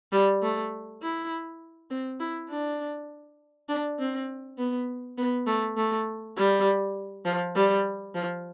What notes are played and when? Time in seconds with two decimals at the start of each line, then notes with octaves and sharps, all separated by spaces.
0.12 G3
0.42 A3
1.02 E4
1.90 C4
2.20 E4
2.49 D4
3.68 D4
3.99 C4
4.58 B3
5.18 B3
5.47 A3
5.77 A3
6.36 G3
7.25 F3
7.55 G3
8.14 F3